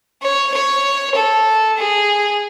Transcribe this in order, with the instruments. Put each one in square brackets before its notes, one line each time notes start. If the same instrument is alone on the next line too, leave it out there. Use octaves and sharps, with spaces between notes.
[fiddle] C#5
C#5
A4
G#4